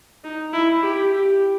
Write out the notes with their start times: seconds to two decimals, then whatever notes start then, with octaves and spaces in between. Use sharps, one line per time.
0.24 D#4
0.53 E4
0.83 G4
1.12 G4